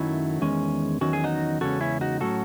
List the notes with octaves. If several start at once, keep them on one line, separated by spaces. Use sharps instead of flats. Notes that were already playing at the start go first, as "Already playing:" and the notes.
Already playing: F#2 D#3 F#3 A3 C#4 E4
E2 D#3 G#3 C#4
E2 D#3 F#3 C#4 F#4
G#4
D#4 F#4
E2 C#3 G#3 C#4 F#4 A4
C#4 E4
D#4 F#4
A2 F#3 A3 C#4 F#4 A4